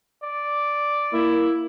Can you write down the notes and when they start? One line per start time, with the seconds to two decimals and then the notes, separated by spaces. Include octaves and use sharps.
0.23 D5
1.12 A#3 E4